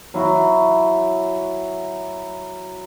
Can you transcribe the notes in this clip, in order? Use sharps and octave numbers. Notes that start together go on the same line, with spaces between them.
F#3 E4 F#4